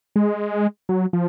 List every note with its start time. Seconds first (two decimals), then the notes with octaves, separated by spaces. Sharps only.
0.16 G#3
0.89 F#3
1.13 F3